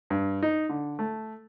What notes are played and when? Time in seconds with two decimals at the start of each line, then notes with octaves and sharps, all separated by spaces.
0.10 G2
0.43 D#4
0.69 D3
0.99 A3